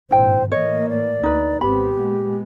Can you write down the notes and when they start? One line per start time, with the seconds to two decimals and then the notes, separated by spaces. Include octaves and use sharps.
0.11 G#1 G2 A#2 E4 C5 G5
0.52 A2 E3 A#3 C#5 D#5
0.89 D5
1.23 D2 D#4 B4
1.61 G#1 B3 C4 G4 B5
1.97 A#2 G#3 B3